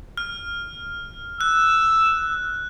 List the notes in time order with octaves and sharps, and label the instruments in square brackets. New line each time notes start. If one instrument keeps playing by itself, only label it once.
[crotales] F6
[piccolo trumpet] E6 [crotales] F#6